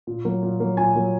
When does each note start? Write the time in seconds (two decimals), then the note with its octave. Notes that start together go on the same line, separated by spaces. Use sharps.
0.07 A#2
0.25 F#3 A#3
0.43 A#2
0.60 F#3 A#3
0.77 A#2 G#5
0.95 F#3 A#3